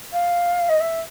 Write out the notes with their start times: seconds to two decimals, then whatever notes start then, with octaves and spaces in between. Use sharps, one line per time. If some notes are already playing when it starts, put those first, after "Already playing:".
0.12 F5
0.68 D#5
0.80 E5